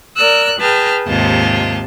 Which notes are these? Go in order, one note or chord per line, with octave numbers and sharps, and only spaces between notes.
A#4 D5 E6 F#6
G#4 B4 G5 A5 F6
D#2 G#2 C3 F4 A5